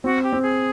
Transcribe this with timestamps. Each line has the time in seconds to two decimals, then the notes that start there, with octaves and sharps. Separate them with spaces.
0.04 C4 F#4
0.23 G4
0.33 C4
0.42 G#4